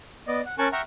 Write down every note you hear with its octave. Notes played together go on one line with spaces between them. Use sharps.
B3 D5 D#5
F#5
C#4 A#4 G#5 A5 C#6 F#6
E5 F#5 G5 A#5 C#6 F6